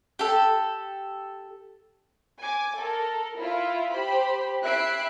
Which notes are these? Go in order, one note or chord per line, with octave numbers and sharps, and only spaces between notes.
G4 A4
G#5 D6
A4 A#4
E4 F4 E5
G4 C5 B5
E4 G4 E5 F#6 C7 D7